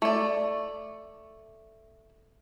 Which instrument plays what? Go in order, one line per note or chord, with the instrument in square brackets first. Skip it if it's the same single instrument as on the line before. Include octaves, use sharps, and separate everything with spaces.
[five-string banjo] A3 D5